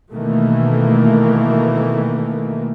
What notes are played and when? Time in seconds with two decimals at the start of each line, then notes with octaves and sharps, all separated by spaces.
0.13 B2 D#3 E3 A3 A#3